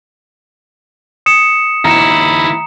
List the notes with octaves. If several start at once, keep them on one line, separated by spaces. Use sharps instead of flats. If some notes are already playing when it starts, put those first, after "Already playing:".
D#6 C#7 E7
D#2 E4 A#5 C#7 E7